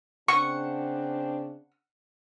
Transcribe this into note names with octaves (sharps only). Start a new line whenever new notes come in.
C#3 C4 D4 F#5 C#6